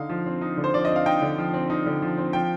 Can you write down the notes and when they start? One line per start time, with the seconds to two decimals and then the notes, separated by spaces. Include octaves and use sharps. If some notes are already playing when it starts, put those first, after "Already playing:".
Already playing: D3 D#4 F5
0.09 F3
0.26 C4
0.41 D#4
0.57 D3
0.64 C5
0.74 F3 D5
0.85 C4 D#5
0.96 F5
1.06 D#4 G5
1.22 D3
1.38 F3
1.54 C4
1.70 D#4
1.86 D3
2.02 F3
2.18 C4
2.33 F3 G5